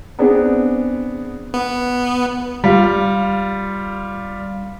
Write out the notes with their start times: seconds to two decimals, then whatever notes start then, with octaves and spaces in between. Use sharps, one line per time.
0.19 B3 C4 D4 G#4
1.54 B3
2.64 G3 F4